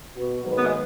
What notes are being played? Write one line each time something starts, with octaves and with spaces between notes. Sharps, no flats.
B2 B3 F#4
G#2 D#3 F#3 D#4 B4
B3
G#3